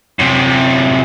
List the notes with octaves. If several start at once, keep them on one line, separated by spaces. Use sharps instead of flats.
F#2 C3